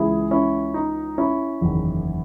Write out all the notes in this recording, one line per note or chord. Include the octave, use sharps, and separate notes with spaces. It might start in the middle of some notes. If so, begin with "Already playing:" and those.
Already playing: C#2 C#3 E3 E4 G#4
C#4 E4
D#4
C#4 E4
F#1 E2 D#3